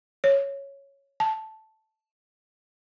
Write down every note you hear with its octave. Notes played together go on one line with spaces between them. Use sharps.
C#5
A5